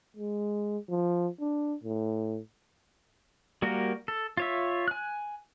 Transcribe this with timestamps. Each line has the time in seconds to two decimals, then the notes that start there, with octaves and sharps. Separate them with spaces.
0.17 G#3
0.89 F3
1.40 D4
1.84 A2
3.62 G3 A#3 F#4 A#4
4.08 A4
4.37 F4 C#5 E5
4.88 G#5 F#6